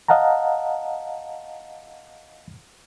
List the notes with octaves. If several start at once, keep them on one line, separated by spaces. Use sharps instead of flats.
D#5 F5 F#5 A5 A#5